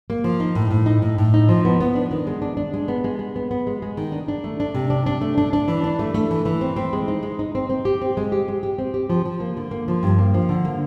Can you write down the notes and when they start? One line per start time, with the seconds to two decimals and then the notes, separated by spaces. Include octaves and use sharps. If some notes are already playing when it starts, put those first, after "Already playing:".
0.10 A#3
0.24 F3
0.40 D#4
0.55 A2
0.71 A2
0.86 D#4
1.02 A2
1.18 A2
1.34 D#4
1.49 F3
1.65 B3
1.80 B3
1.95 D4
2.11 D#3
2.27 G#3
2.42 D4
2.57 D4
2.74 G#3
2.88 B3
3.04 G#3
3.19 G#3
3.36 B3
3.51 B3
3.67 G#3
3.82 G#3
3.97 D#3
4.12 D4
4.28 D4
4.44 A3
4.60 D4
4.75 C3
4.90 D4
5.06 D4
5.21 A3
5.38 D4
5.53 D4
5.68 E3
5.84 D4
5.99 A3
6.14 A3
6.31 E3
6.45 E3
6.61 C4
6.76 C4
6.93 G#3
7.08 D#4
7.23 G#3
7.39 D#4
7.55 C4
7.70 C4
7.85 G4
8.02 C4
8.17 G#3
8.32 G4
8.48 G#3
8.63 G4
8.78 C4
8.94 G4
9.10 F3
9.25 F3
9.40 A#3
9.57 D3
9.71 A#3
9.88 F3
10.03 G2
10.19 A#3
10.34 F3
10.49 D3
10.65 A#3